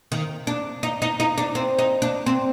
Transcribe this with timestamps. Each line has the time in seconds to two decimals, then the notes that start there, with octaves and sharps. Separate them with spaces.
0.12 D#3
0.47 D4
0.83 D#4
1.02 D#4
1.20 D#4
1.38 D4
1.55 C4
1.79 D#4
2.02 D4
2.26 C4